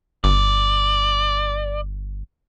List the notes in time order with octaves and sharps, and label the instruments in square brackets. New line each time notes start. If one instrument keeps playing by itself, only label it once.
[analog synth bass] G1 [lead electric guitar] D5